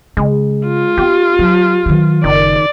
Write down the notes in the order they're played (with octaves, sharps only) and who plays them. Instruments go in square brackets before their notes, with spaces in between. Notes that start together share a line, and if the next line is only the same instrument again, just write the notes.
[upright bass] C#3 [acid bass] G#3
[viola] F4
[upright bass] B3 [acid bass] G4
[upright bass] F#3
D#3 F#3
[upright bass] F#1 [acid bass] D#3 [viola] D5